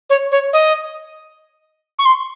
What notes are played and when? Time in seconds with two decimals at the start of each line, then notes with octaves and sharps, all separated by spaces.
0.09 C#5
0.31 C#5
0.53 D#5
1.98 C#6
2.05 C6